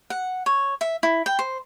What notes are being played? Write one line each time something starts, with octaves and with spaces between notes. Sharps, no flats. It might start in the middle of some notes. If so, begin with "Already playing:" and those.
F#5
C#5
E5
E4
G5
C5